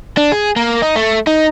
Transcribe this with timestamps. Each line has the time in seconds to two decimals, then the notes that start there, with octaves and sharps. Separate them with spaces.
0.17 D4
0.32 G#4
0.56 A#3
0.82 D#4
0.96 A3
1.27 D#4